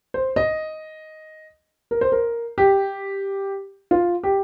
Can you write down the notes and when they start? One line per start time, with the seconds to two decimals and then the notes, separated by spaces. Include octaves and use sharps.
0.14 C5
0.36 D#5
1.91 A#4
2.01 C5
2.12 A#4
2.58 G4
3.91 F4
4.23 G4